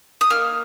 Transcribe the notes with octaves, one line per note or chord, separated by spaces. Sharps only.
D#6
A#3 D#4 F6